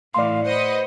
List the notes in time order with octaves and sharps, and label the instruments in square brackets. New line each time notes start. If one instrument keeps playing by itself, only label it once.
[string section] A2 E3 [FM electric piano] D5 C6 [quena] F5
[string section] B4 D#5 F#5 [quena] C5